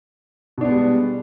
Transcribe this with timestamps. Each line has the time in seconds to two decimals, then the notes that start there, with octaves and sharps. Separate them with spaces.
0.58 B2
0.61 D4
0.65 B3
0.68 G#3
0.72 G3